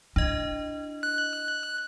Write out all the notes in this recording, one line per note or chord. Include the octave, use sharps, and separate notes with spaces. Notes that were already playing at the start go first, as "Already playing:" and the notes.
D4 E4 D#5
F#6